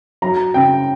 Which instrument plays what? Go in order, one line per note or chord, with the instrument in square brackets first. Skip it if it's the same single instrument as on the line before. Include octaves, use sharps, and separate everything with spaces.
[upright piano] F#3 A#5
C#3 G5